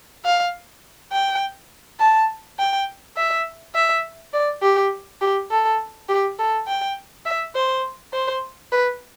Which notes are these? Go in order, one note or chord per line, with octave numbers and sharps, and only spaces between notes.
F5
G5
A5
G5
E5
E5
D5
G4
G4
A4
G4
A4
G5
E5
C5
C5
B4